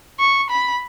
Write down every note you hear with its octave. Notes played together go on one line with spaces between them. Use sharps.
C#6
B5